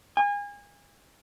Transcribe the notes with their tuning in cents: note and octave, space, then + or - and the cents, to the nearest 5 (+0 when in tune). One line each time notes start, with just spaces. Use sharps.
G#5 -30